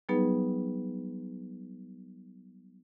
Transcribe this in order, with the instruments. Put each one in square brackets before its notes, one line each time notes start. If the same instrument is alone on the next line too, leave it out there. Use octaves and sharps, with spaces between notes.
[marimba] F#3 G3 B3 D#4 G#4 B4